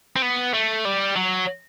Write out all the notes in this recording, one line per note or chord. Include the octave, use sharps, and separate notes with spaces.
C4
B3
A3
G3
F#3